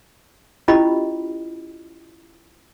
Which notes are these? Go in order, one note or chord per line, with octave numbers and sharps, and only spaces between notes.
C#4 E4 F4 G4 D#5 B5